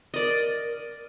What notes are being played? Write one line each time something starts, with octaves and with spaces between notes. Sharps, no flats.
A#4 D5 D#5